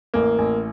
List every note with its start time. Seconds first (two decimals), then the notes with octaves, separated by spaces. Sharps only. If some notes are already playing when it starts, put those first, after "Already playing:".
0.14 A1 A#3
0.38 A1